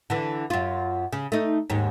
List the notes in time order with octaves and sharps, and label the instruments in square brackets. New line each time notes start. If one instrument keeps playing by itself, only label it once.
[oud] D3 E3
F#2 F4
C#3
A3 D#4
D#2 G#2